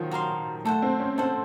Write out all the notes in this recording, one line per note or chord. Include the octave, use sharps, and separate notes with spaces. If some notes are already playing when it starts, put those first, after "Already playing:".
Already playing: D#3 F3 F#3
F#4 A#4 F5 C6
A3 A4 C5 F#5
C4
C#4
C4 A4 C5 F#5